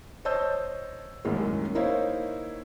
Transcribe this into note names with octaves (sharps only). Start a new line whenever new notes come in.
C5 C#5 D#5 A5 E6 G6
C2 F#2 A2 D#3 G#3 A#3
A#3 D#4 E4 C5 C#5 F5